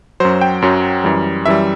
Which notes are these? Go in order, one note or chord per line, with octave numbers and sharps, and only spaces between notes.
F#2 F#3 C5
G5
F#2 F#3
F#2 E3 G3
F#2 E3 G3 E5